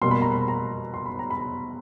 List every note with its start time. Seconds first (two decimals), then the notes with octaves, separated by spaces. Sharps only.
0.02 B2 G3 A#3 C6
0.11 B5
0.22 A#5
0.32 B5
0.48 A#5
0.94 C6
1.06 B5
1.19 A#5
1.31 B5